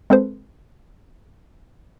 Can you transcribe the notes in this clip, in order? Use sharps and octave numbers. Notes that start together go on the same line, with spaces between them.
G#3 C4 A4 B4 C5